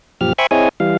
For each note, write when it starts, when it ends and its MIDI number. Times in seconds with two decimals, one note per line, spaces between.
0.21 0.33 42
0.21 0.33 46
0.21 0.33 53
0.21 0.33 67
0.21 0.33 89
0.38 0.47 72
0.38 0.47 76
0.38 0.47 79
0.38 0.47 80
0.38 0.47 83
0.38 0.47 85
0.51 0.69 60
0.51 0.69 64
0.51 0.69 68
0.51 0.69 73
0.51 0.69 75
0.51 0.69 80
0.80 0.97 52
0.80 0.97 55
0.80 0.97 77